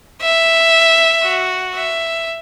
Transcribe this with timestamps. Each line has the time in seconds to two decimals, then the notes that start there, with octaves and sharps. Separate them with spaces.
0.22 E5
1.23 F#4
1.75 E5